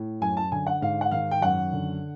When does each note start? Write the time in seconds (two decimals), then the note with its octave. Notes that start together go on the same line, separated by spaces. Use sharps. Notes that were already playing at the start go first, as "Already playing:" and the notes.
Already playing: A2
0.21 F#2 G#5
0.37 A5
0.52 D3 G#5
0.67 F#5
0.81 G#2 F5
1.01 F#5
1.11 D#3 F5
1.31 G5
1.42 F#2 F#5
1.73 D3